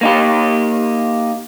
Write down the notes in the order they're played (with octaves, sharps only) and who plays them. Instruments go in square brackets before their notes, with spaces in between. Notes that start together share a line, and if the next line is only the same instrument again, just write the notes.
[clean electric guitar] A#3 D#4 G4